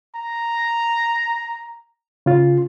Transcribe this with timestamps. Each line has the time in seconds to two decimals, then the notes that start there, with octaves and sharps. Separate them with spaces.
0.15 A#5
2.26 C#3 F4